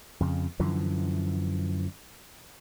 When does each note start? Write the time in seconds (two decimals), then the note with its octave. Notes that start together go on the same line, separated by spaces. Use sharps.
0.20 F2 C#3
0.60 F#2 D3 E3 F3